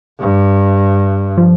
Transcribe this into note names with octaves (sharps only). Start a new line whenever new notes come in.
G2
F3